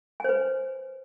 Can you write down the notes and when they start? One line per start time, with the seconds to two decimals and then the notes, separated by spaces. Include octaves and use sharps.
0.20 G#5
0.24 C5
0.29 B4